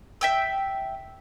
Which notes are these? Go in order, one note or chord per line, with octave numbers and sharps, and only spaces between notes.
E5 G5 E6